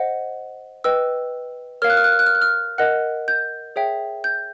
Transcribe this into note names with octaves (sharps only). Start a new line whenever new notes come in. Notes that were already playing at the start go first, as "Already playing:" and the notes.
Already playing: C5 D#5 F#5
B4 D#5 G5 E6
A#4 C#5 F5 F6
F#6
F6
F#6
F6
F#6
F6
F#6
F6
A#4 D#5 F#5 F#6
G6
G#4 C#5 E5 G5
G6